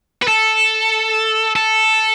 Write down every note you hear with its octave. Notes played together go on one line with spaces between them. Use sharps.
B4
A4
A4